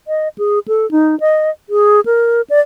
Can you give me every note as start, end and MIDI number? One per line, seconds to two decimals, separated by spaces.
0.08 0.28 75
0.38 0.59 68
0.68 0.89 69
0.91 1.18 63
1.20 1.50 75
1.70 2.00 68
2.06 2.42 70
2.50 2.60 74